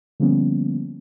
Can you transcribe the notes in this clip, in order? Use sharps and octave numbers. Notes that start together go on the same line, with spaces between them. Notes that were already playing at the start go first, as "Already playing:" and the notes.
D3 F3 G3 A#3 B3 C#4